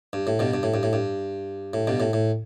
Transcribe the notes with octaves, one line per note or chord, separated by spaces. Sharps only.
G2
A2
G2 B2
G2
A2
G2
A2
G2
A2
G2 B2
A2
A2